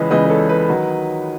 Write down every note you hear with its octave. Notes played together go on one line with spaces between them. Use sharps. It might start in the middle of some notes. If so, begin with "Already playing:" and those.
Already playing: C#2 C#3 E3 B4 D#5
C#2 C#3 E3 B4 D#5
B4
A4 C#5
B4 D#5
D#3 F#3